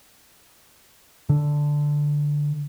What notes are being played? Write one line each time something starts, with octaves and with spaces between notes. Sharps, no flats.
D3